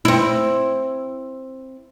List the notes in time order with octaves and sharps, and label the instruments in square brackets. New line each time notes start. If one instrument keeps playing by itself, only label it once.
[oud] C4 E4